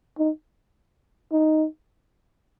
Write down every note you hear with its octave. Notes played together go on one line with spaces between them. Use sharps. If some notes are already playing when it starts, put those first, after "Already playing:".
D#4
D#4